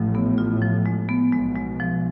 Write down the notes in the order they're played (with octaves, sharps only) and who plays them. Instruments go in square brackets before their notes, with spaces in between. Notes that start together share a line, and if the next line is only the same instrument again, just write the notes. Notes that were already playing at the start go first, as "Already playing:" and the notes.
Already playing: [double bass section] A1 A2 [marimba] F3
[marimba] B3
F4
F3
G#3
B3
[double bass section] B1 B2 [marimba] G#3
[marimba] G#3
F3